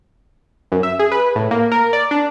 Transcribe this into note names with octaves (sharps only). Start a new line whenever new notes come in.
F#2
E5
G#4
B4
A2
A#3
A#4
D5
D4